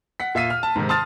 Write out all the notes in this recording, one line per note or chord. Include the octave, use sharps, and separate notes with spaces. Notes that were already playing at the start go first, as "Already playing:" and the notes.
F#5 B6
A#2 E5 F5 B6 D#7
F6
A5
G#2 C3 D#3
A5 C6 D#6 F6 A6